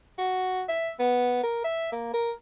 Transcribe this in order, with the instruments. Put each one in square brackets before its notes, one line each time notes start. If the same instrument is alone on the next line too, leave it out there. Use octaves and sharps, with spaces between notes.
[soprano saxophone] F#4
E5
B3
A#4
E5
A#3
A#4